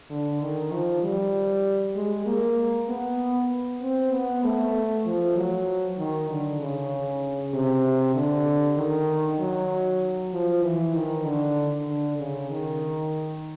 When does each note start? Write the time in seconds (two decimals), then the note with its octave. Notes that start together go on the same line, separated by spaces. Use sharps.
0.10 D3
0.41 D#3
0.72 F3
1.02 G3
1.95 G#3
2.26 A#3
2.88 B3
3.82 C4
4.12 B3
4.44 A3
5.06 F3
5.36 F#3
5.98 D#3
6.30 D3
6.61 C#3
7.54 C3
8.15 D3
8.77 D#3
9.39 F#3
10.33 F3
10.63 E3
10.94 D#3
11.25 D3
11.87 D3
12.18 C#3
12.50 D#3